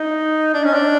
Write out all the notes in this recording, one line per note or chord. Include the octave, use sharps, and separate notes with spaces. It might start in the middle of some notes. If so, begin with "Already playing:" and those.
Already playing: D#4
D4
C#4
D4